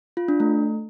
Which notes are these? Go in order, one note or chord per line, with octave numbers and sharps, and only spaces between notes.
F4
D4
A3